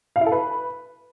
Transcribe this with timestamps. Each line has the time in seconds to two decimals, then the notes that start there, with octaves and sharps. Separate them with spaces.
0.16 F5
0.21 E4
0.26 A4
0.32 B4